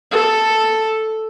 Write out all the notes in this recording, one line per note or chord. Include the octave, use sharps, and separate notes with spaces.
A4